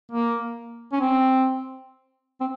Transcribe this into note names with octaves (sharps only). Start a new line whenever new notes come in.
A#3
C#4
C4
C4